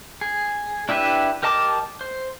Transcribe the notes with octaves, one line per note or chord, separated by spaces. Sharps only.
G#4
D4 E4 G4 B4 E5
G4 A#4 D#5 A5 D6
C5